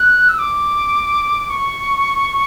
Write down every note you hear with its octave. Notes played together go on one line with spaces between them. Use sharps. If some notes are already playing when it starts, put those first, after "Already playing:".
Already playing: F#6
E6
D6
C#6